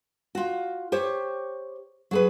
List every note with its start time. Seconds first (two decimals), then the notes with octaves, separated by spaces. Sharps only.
0.35 F4 F#4
0.92 G4 C5 C#5
2.11 F#3 G#4 B4